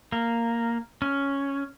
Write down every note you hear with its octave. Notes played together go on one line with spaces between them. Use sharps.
A#3
C#4